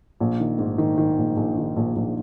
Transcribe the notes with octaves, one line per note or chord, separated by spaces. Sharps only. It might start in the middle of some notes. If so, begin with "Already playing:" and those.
A#1
D#3
G#2
D#3
D#3
A#1
A#1
D#3
A#1
A#1